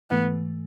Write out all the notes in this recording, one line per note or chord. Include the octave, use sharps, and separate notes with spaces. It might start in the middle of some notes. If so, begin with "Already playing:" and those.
G#2 E3 A3 B3